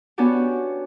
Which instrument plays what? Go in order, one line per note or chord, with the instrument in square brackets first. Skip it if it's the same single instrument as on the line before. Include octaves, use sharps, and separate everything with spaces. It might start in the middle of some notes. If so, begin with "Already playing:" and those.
[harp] B3 C#4 D4 F#4 G4